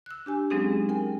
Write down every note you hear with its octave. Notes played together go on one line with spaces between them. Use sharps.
E6 F#6
D4 G4 G#5
F#3 G#3 C4 C#4 D#4 G#4
A#4 G5 G#5